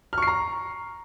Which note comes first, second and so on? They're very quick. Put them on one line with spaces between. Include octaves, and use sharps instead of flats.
F6 C#6 C7 A#5